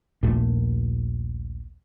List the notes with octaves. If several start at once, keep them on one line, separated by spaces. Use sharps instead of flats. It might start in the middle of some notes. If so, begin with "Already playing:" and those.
A#1 D#2 A#2 A3